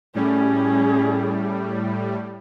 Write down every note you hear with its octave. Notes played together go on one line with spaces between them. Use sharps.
A2 G3 C#4 G#4